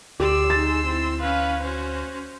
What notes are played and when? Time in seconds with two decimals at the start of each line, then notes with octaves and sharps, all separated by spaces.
0.20 D2 G4 D5 C6 E6
0.50 D#4 G#4 A6
0.86 C4 E4
1.21 C#4 B4 F5
1.62 C#4 F#4 C5